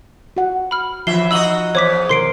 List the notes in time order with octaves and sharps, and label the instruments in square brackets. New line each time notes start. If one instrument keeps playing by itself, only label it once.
[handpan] F#4 F#5
[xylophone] B5 F6
[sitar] D#2 E3 E5 [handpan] F3 [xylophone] C7 G7
[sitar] D#4 F#4 D#5 [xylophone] E6 F#7 G7
[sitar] E2 [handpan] C5 [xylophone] C#5 D6 B6
[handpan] B2 D#3 A#4 [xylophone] C6 C7 D7